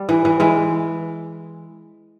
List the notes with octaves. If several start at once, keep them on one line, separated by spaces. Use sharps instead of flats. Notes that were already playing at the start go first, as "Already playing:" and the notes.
Already playing: G3
E3
E3
E3 G#3